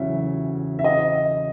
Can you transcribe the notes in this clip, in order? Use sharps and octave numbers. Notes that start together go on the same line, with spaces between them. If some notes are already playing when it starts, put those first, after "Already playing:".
Already playing: E2 C#3 F#3 E5
E5
D#5